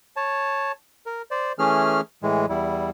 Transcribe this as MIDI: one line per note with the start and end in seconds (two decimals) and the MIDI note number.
0.16 0.72 73
0.16 0.72 81
1.06 1.22 70
1.31 1.52 72
1.31 1.52 74
1.59 2.01 52
1.59 2.01 57
1.59 2.01 61
1.59 2.01 68
1.59 2.01 89
2.23 2.46 45
2.23 2.46 52
2.23 2.46 56
2.49 2.90 40
2.49 2.90 55
2.49 2.90 64